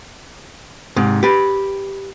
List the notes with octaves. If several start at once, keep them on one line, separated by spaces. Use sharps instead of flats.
G#2 C3
G4 B4